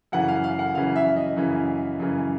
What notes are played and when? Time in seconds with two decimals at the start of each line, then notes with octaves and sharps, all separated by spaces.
0.12 F#2 C#3 E3 F#5
0.28 F5
0.44 F5
0.59 F#5
0.74 F#2 C#3 E3 F5
0.96 E5
1.16 D#5
1.36 F#2 C#3 E3
2.00 F#2 C#3 E3